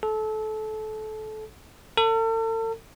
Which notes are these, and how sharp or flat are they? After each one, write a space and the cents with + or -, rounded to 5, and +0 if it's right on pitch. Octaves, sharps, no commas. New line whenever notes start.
A4 -25
A4 +40